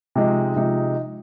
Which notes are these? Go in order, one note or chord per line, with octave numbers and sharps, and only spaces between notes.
C3 F3 G#3 D#4
C3 F3 G#3 D#4